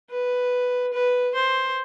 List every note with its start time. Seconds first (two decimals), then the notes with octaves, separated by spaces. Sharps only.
0.10 B4
0.93 B4
1.35 C5